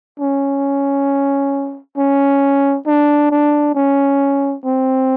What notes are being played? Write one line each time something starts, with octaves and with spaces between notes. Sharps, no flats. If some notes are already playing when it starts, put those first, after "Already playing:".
C#4
C#4
D4
D4
C#4
C4